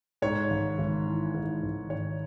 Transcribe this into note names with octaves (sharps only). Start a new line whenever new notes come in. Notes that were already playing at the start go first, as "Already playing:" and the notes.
G#2 C#5
G#1
G#1
E3
G#2
G#1
G#1 C#5